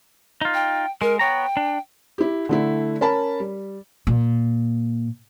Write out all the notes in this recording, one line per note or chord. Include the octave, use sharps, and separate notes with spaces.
D#4 F4
G5
G#3 A#4
B3 C#5 G5 A#5
D4
E4 G4
D3 A3 E4
C#4 A#4 A5 B5
G3
A#2